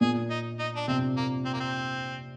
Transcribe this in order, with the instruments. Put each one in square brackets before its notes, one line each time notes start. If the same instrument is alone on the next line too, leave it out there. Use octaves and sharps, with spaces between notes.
[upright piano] A#2 [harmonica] G#4
[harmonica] D#4
D#4
D4
[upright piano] C3 [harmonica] C4
[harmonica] A#3
C4
A#3
C4